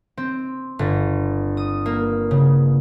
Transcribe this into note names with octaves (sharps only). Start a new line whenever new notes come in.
C4
G1
D#6
A#3
C#3